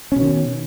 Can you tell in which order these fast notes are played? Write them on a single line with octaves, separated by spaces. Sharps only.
C#4 B2 D#3